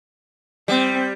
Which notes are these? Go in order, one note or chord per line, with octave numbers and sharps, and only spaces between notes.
G3 C4